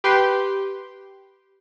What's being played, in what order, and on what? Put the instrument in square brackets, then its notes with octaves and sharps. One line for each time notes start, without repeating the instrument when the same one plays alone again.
[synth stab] G4 B4 G5 C6